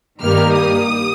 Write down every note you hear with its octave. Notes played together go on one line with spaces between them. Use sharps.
G2 D#3 G3 A#3 F6
D#6